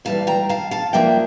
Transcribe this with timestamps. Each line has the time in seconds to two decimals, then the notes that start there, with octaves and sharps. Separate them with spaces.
0.05 A2 E3 G3 F5 A5
0.27 G5 A#5
0.49 F5 A5
0.71 F5 A5
0.93 F3 A#3 D4 E5 G5